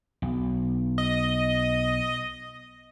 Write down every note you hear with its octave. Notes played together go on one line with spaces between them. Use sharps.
B1
D#5